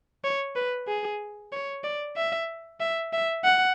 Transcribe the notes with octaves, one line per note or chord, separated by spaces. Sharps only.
C#5
B4
G#4
C#5
D5
E5
E5
E5
F#5